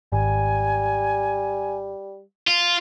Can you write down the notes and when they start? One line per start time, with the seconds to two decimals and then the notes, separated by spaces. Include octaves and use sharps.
0.12 G#1 G3 G#5
2.47 F4